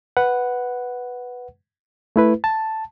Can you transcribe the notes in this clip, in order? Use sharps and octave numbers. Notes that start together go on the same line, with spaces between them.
B4 F#5
A3 E4 B4
A5